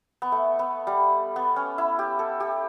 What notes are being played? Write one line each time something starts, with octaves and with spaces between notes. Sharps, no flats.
B3
A3
B3
G3
B3
C#4
E4
G4
A4
G4